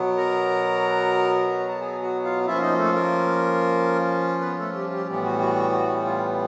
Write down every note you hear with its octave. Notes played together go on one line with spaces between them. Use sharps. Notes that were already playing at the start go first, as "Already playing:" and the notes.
Already playing: B2 F#3 B3
A#4 A#5
A#5
A5
G#4 G#5
F#4 F#5
F4 F5
F3 A#3 C#4 E4 F4 E5
D#4 D#5
A3 A4
A#3 A#4
B3 B4
A3 A4
G3 G4
G3 G4
A2 E3 G3 B3 G4
F#4
F#4
F#4
F#4
F4